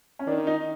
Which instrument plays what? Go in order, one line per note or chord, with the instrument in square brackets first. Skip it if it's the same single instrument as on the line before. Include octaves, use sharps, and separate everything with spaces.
[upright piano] C#4
[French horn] D#3 [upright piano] D4
[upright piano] D#4